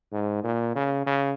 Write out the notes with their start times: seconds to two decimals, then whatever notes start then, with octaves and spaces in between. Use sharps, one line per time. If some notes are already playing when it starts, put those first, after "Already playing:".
0.12 G#2
0.44 A#2
0.75 C#3
1.06 C#3